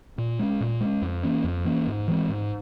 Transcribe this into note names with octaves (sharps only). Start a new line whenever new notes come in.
A#2
G#3 C#4
A#2
G#3 C#4
F2
E3 A#3 C#4
F2
E3 A#3 C#4
G#2
E3 G#3 C4
G#2